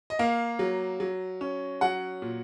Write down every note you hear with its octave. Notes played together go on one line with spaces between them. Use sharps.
D#5
A#3 F5
F#3
F#3
C#4
F#3 F#5
A#2